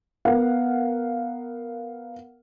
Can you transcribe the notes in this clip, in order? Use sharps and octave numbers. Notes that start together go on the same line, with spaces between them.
B3 A#4 F5 F#5